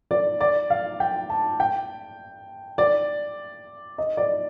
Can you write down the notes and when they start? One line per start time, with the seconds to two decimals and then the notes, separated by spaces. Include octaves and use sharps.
0.11 D5
0.41 D5
0.70 F5
1.00 G5
1.30 A5
1.60 G5
2.78 D5
3.98 D#5
4.17 D5